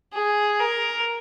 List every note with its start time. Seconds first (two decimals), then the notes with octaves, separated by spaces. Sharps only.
0.14 G#4
0.60 A#4